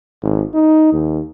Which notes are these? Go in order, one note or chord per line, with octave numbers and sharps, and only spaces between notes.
G#1
D#4
D#2